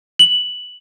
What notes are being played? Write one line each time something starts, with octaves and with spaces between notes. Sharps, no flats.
F#7